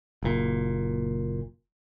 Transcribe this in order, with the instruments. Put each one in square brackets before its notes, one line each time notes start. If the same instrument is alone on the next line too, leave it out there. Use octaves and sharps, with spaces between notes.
[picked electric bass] F#1 A#2